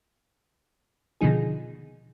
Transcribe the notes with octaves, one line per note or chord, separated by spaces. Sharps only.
B2 D3 D#3 F3 D#4 G#4